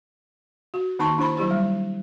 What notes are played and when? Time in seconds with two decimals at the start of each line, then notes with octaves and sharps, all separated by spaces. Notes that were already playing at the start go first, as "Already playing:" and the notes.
0.74 F#4
0.99 D#3 A#3 D#4 A5 C6 C#6
1.18 D4 E4 C5 A#5 B5
1.37 F#3 E4 G4 C5
1.51 G3